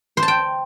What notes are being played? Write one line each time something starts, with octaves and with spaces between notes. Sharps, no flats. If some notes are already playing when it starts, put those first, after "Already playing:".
C5
A5
G5